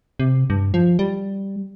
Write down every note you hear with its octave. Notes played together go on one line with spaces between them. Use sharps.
C3
G2
F3
G3